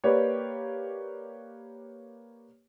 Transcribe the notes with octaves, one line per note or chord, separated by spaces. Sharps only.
A#3 G4 B4 C#5 D5